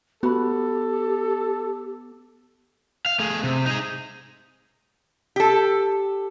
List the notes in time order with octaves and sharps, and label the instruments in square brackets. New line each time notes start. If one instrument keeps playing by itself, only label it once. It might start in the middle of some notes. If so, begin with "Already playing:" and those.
[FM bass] B3 [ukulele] F#4 B5 [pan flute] G4 [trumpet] A4
[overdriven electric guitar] F5
A3 G#4
C3
D#4 G#4
[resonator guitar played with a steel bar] G4 A4